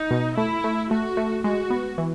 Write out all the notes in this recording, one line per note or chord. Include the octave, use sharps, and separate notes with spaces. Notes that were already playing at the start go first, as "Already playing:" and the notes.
Already playing: D#4
B2
A3 E4
A3
A3 F#4
A3
G#3 F#4
B3
E3